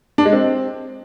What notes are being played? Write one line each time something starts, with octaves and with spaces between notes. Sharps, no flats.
D4
G#3
C4